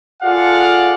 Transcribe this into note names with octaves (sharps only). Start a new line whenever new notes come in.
F4 G#4 A4 D5 F5 F#5